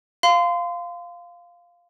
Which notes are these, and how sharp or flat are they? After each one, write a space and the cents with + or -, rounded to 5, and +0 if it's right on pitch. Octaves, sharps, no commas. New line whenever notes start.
F5 +0 C6 -30